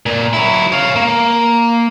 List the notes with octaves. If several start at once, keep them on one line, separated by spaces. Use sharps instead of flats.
A#2
F#3 E4
C#5 F5
A#3